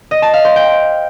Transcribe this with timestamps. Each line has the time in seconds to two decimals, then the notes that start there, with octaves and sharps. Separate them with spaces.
0.11 D#5
0.22 A5
0.34 F5
0.45 C5
0.56 G5